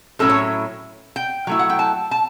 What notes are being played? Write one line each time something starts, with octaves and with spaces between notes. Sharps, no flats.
A2 F#3 C#4 E4 A4
C#5
G5
F#3 A3 E4
F#5
G5
A5
A5